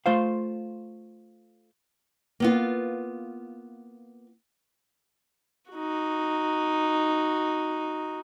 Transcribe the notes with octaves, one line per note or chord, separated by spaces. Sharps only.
A3 F4 C5 F5
A#3 B3 F4
D#4 F#4